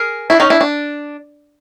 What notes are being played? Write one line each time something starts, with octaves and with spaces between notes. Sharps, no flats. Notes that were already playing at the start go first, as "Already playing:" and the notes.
Already playing: G#4 A#4
D4 E4
C#4 D#4
D4 E4
D4